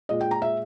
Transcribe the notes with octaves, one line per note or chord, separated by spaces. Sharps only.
A#2 G#3 D#5
G5
A#5
E5